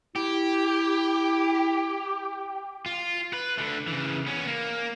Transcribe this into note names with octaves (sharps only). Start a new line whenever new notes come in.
E4 G4
F4
B4
D3 A3
C#3 E3
B3 C#4
A#3